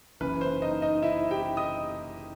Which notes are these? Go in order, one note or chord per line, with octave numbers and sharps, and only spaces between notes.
F#1 F#2 E3 B4
C5
D#4 D#5
D#4 D#5
E4 E5
G4 G5
D#5 D#6